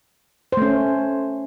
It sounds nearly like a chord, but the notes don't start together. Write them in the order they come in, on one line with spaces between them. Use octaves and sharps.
C5 A3 C#4